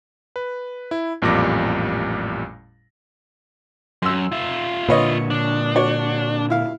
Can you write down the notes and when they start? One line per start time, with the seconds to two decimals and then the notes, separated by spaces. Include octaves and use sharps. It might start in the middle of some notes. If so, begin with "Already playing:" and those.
0.36 B4
0.91 E4
1.22 A1 F2 A#2 G3 D6 A#6
4.02 F#2 C6 E6
4.32 F4 E5
4.89 A#2 D3 B4 C#5 D#5
5.30 D4
5.76 F#4 C#5 D5
6.50 E4 F5